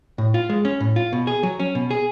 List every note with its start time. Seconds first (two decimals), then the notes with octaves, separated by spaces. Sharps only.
0.18 A2
0.34 F4
0.49 G#3
0.65 C#4
0.80 A2
0.96 F4
1.13 B2
1.27 G#4
1.43 F#3
1.60 C#4
1.75 B2
1.90 G#4